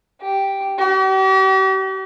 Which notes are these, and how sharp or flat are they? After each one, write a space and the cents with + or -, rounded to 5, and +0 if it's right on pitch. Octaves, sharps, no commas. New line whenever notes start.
G4 +0
G4 -45